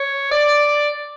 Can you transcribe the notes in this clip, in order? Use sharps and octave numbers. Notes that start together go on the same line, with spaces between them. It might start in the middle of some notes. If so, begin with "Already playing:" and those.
Already playing: C#5
D5